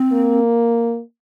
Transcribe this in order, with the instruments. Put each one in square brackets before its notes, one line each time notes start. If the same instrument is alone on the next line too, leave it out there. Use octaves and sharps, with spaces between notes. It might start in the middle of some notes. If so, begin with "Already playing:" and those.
Already playing: [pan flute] C4
[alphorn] A#3